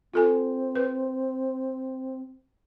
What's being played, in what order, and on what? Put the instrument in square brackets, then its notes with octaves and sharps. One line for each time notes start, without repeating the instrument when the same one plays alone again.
[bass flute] C4 [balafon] F4 A4 G#5
[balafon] B4